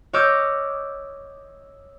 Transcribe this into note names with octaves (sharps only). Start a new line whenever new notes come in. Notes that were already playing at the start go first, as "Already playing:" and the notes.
C#5 D#5 D6 E6 F6 G6